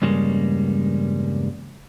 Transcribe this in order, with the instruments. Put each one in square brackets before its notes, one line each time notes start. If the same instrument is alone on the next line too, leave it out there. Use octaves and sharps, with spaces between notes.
[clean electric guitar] E2 G2 C#3 G3 G#3 A#3